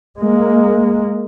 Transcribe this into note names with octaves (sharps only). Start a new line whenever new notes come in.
G#3 A#3